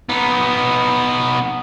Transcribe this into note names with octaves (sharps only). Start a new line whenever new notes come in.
B3 D#4